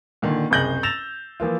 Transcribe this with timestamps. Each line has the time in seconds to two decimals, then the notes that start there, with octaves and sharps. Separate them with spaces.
0.22 A#2 D3 D#3
0.51 F#1 C2 G#4 G6 A#6 F#7
0.83 E6 A6 A#6 E7 F7
1.40 E3 F3 A#3 F4